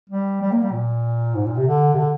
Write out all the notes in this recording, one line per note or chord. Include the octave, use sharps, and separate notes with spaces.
G3
G3
A#3
G3
A#2
G#2
A#2
C3
D3
C3
D3